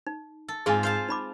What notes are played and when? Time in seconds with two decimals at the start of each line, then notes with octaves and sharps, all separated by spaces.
0.07 D#4
0.48 A4
0.66 G#2 C4 F4 G#4 G#5
0.83 C5 F5 A5
1.09 D#4 B5 D6